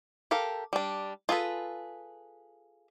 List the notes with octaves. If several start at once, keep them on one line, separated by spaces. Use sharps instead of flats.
G4 A4 A#4 F5
G3 D4
F4 G#4 A4 B4